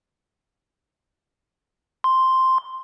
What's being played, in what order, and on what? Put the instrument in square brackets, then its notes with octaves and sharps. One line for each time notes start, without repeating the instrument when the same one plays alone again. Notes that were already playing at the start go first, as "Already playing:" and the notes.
[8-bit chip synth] C6